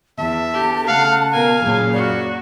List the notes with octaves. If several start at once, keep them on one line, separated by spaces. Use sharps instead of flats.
E2 E5 A5
D3 G4
C#3 A3 F5 F#5
B2 A#4 F5 G#5
F#2 A#2 C#3
F#3 F#4 D5